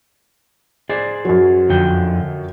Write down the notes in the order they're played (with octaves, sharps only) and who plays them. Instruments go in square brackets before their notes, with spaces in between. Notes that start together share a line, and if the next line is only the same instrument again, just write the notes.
[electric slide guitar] G#4 C5 D5
[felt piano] F#2 F#3
[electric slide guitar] F2 D3 G5